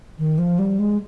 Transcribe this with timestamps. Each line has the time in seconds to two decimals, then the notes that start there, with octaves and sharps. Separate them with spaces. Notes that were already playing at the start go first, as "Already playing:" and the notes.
0.18 D#3
0.38 F3
0.59 G3
0.79 G#3